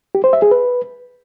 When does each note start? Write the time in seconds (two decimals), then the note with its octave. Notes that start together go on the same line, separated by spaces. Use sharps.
0.15 G4
0.24 C5
0.33 E5
0.42 G#4
0.51 B4